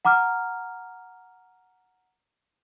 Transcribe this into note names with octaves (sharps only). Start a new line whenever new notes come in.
F#5 A#5 D6 F6